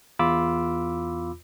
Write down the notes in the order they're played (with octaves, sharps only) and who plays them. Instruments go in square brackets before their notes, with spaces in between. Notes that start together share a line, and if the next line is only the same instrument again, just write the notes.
[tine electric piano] E2 F4 B5 D6 E6